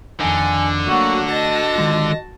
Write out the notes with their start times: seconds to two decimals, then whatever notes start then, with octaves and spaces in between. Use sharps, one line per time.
0.20 F2 D3 D#3 D#4 G#5
0.87 F#3 A3 A#3 F#4 F#5 C#6
1.31 F#4 D#5 A5 A#6
1.76 D#3 G#3 F4